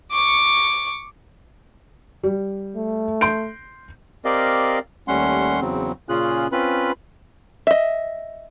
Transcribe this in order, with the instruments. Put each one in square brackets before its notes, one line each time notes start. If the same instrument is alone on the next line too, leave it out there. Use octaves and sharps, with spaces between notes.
[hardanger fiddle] C#6 D6
[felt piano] G3
[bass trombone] A3
[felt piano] C6 G6 D7
[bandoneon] C4 G4 A#4 D5 D#5 F5
D#2 G3 A3 C#4 F#5 C6
E2 C#3 F#3 C4
A#2 C#3 C#4 F4 G#4 F#6
C4 C#4 F4 B4 B5
[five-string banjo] D#5 E5